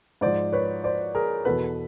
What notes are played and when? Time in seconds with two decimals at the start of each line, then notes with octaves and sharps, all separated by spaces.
0.21 G#2 F3 C5 D5
0.53 B4 C#5
0.84 C5 D5
1.15 G#4 A#4
1.45 E2 B2 A4 B4